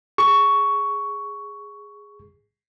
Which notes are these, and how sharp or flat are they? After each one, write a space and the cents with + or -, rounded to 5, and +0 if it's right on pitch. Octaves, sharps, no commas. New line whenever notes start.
G#4 -5 C#6 +10